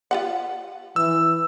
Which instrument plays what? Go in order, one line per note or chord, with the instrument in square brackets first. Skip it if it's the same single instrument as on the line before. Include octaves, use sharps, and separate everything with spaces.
[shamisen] F4 G4 F#5
[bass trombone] E3 [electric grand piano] E6